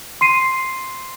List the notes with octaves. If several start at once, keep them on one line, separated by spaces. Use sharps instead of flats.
C6 C7 D#7